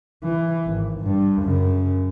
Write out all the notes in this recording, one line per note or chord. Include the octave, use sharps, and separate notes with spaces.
E3
G#1
G2
F#2 C#3